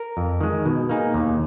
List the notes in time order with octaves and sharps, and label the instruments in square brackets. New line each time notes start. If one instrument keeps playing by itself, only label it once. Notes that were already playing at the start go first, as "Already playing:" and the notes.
Already playing: [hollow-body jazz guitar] A#4
[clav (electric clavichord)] F2
D#3 G#3
B2
A#3 D#4 G#4
D#2